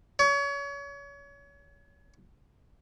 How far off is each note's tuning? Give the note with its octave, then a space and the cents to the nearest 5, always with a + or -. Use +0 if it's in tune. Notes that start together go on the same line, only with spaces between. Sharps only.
C#5 +30